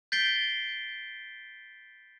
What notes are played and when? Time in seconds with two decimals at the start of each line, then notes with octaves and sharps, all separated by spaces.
0.12 G6 A6 B6 C7 D7 G7